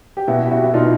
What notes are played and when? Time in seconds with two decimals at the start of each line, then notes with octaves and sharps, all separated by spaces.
0.17 G4
0.28 B2 E4 F#4
0.46 G4
0.51 E4 F#4
0.64 E4
0.74 B2 D#4 F4